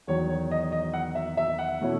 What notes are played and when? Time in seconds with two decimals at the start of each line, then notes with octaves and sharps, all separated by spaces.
0.07 E2 D#3 F#3 C#5
0.29 C#5
0.51 D#5
0.72 D#5
0.94 F#5
1.15 E5
1.37 E5
1.59 F#5
1.81 B2 A3 C#4 E4